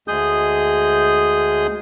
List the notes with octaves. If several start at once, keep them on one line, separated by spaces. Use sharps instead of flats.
D2 G#3 G#4 D#6 G6